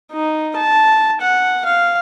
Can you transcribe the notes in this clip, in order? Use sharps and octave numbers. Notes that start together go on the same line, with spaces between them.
D#4
A5
F#5
F5